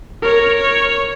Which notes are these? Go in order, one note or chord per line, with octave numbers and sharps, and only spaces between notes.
A#4 C#5
C#5